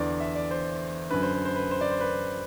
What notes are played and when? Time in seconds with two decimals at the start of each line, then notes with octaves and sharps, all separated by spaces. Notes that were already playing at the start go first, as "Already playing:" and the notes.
Already playing: E2 D3 D5
0.20 E5
0.35 D5
0.51 C5
1.11 F#2 D3 B4
1.22 C5
1.34 B4
1.45 C5
1.56 B4
1.71 C5
1.81 D5
1.91 C5
2.01 B4